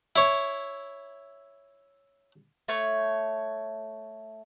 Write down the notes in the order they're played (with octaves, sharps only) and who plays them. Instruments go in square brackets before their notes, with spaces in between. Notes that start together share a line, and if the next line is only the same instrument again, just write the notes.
[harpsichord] E4 C#5
[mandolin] A3 C#5